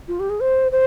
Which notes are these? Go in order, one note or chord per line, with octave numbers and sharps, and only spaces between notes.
F4
G4
G#4
C5
C5